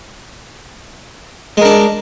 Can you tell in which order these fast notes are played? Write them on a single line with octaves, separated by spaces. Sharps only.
G#3 A#4 D4